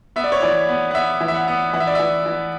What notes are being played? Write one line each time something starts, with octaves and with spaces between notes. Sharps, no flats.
B3 E5
D5
C#5
E3 D5
B3
F#5
B3 E5
E3
E5
F#5
B3
E3 F#5
E5
D5
E3 E5
E3